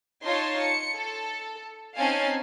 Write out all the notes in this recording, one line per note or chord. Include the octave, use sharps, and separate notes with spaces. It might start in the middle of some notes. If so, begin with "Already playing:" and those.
D#4 F4 C#5 A5 C6
C#7
A4
C4 C#4 D#4 F5 G#5 A5